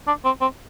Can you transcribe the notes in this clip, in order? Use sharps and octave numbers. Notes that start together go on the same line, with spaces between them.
D4
C4
C4